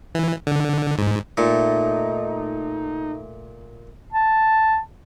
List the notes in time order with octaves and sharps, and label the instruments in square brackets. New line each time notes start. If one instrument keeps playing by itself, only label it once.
[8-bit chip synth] E3
D3
G#2
[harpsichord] A#2 [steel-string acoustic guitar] A3 [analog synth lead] D#4
[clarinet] A5